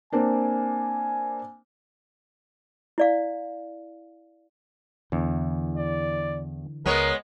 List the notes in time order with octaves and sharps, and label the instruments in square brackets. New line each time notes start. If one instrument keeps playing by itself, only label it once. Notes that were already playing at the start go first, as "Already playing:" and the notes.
[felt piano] A#3 C4 D4 [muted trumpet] G#5
[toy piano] E4 D5 F5
[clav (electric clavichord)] E2 [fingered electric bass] D3 E3
[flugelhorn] D5
[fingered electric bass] C#2 [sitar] G#3 B3 C#5 [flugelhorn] A#4